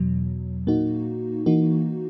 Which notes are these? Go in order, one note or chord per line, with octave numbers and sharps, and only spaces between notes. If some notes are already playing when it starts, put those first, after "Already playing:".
Already playing: E2 B2 F#3
A#2 A#3 D#4 F#4
E3 A#3 D#4 F#4